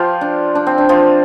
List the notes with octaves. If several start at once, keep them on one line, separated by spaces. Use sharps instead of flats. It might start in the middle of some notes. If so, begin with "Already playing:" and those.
Already playing: F3 F4 G4
D4
D4
C4
D4
F3 F4